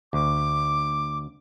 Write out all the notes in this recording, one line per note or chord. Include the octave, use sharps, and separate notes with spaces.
D2 D6